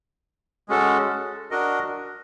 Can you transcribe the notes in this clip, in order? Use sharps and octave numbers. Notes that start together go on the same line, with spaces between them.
G#3 C#4 F#4 A4
D4 F#4 A#4 D#5